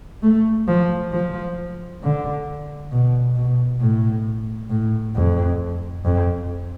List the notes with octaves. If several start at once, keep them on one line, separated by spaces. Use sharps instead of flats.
A3
F3
F3
D3
B2
B2
A2
A2
F2
F2